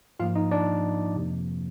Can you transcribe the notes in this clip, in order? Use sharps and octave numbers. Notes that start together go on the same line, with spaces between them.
G#2 F3 A#3 F4 F5
D#4 D#5
D4 D5
F2 C3 F3 A#3